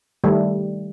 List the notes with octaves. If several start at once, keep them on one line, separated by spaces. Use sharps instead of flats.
D#3 G3 A3